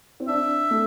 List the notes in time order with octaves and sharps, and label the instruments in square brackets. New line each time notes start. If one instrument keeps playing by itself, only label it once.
[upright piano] C4
[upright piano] D4 [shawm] E5
[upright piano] A3